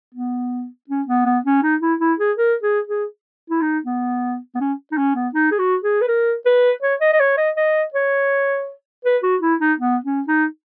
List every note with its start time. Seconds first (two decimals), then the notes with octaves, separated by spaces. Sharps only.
0.15 B3
0.89 C#4
1.08 B3
1.26 B3
1.45 C#4
1.62 D#4
1.81 E4
2.00 E4
2.19 G#4
2.37 A#4
2.63 G#4
2.87 G#4
3.50 E4
3.61 D#4
3.85 B3
4.55 B3
4.60 C#4
4.91 D#4
4.97 C#4
5.15 B3
5.34 D#4
5.51 G#4
5.59 F#4
5.83 G#4
6.01 B4
6.08 A#4
6.46 B4
6.82 C#5
7.01 D#5
7.13 D#5
7.20 C#5
7.37 D#5
7.57 D#5
7.94 C#5
9.05 B4
9.23 F#4
9.42 E4
9.60 D#4
9.79 B3
10.04 C#4
10.27 D#4